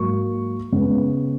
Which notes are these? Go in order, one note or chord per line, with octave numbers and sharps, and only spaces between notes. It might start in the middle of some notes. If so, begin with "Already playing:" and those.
Already playing: G#2 F#3 A#3 C#6
C#3 G#3 B3